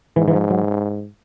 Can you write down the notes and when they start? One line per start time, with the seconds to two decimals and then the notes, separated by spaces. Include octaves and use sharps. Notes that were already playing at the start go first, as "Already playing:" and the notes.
0.16 G#2 E3
0.28 E3
0.33 F3
0.50 F#3